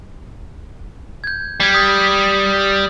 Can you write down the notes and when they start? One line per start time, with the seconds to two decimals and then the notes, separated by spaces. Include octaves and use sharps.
1.24 G6 G#6
1.60 G3 G#6 B6
1.74 D#6 G#6 B6